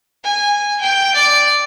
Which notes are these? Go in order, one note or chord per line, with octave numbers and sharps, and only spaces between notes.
G#5
G5
D5